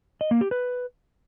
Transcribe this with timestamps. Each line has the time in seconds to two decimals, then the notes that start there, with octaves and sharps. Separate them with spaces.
0.21 D#5
0.31 A#3
0.41 G4
0.51 B4